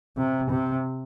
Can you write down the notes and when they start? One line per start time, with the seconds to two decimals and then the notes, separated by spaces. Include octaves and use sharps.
0.17 C3
0.50 C3